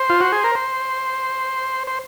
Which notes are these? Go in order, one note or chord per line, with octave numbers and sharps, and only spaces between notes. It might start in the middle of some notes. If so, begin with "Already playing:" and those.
Already playing: C5
F4
F#4
G#4
A#4
C5
C5